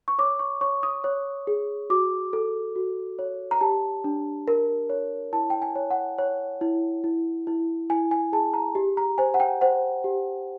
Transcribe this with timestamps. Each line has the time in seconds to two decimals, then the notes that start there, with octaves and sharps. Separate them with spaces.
0.08 C#6
0.19 C#5 D6
0.39 C#6
0.61 C#5 C#6
0.83 D#6
1.04 C#5
1.47 G#4
1.90 F#4 D6
2.33 A4
2.76 F#4
3.19 C#5
3.51 A#5
3.61 G4 A5
4.04 D4
4.48 A#4
4.90 C#5
5.33 E4 A5
5.50 G5
5.62 G#5
5.76 C#5
5.90 F#5
6.18 C#5
6.61 E4
7.04 E4
7.47 E4
7.90 E4 G#5
8.11 G#5
8.32 G#4 A5
8.54 A#5
8.75 G4
8.97 A#5
9.18 C5 G#5
9.34 F#5
9.40 G5
9.61 C5 F#5
10.04 G4